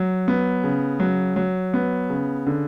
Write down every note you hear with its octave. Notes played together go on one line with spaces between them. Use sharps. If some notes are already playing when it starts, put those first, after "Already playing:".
Already playing: F#3
B3
C#3
F#3
F#3
B3
C#3
D3